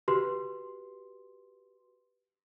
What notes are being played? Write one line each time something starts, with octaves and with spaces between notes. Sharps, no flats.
F#4 G4 B4 C6